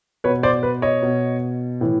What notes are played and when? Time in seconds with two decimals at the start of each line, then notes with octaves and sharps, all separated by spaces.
0.24 B2 B4 C#5
0.43 C5 D5
0.63 B4
0.82 C#5 D#5
1.02 B2
1.81 A2 E3